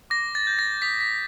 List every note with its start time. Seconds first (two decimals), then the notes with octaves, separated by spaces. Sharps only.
0.10 D6 A#6
0.35 A6
0.47 G6
0.59 A#6
0.82 D#6 B6
1.00 B6